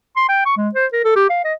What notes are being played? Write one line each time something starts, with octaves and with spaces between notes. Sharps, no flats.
C6
G5
C#6
G#3
C5
A#4
A4
G4
F5
D#5